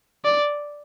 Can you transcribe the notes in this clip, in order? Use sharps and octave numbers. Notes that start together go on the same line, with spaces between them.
D5